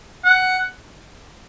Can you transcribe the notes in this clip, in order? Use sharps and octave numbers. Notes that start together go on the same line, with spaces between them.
F#5